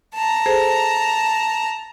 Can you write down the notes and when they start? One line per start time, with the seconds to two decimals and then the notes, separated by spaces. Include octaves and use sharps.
0.15 A5 A#5
0.46 G#4 A4 C5